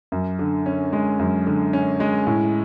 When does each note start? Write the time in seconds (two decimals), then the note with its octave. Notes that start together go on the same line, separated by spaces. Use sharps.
0.12 F#2
0.39 D3
0.66 C#4
0.93 G#3
1.19 F#2
1.47 D3
1.73 C#4
2.00 G#3
2.27 A2